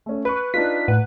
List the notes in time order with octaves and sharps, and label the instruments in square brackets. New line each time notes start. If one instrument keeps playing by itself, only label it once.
[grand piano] A3 C#4
[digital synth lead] B4 [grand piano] B5 C#6
[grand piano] D4 D#4 F4 [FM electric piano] B6
[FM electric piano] A2 [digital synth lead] B4 [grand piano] F#5